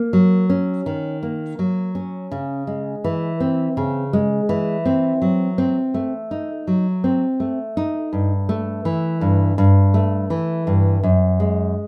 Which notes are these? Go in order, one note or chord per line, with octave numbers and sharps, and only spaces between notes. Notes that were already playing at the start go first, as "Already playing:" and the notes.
Already playing: A#3
F#3
C#4
D#3
A#3
F#3
C#4
C#3
G#3
E3
C4
C#3
G#3
E3
C4
F#3
C4
A3
D#4
F#3
C4
A3
D#4
G2
A3
E3
G2
G2
A3
E3
G2
F#2
G#3